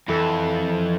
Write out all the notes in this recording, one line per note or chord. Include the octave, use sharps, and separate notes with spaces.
F2 E3 A4 E6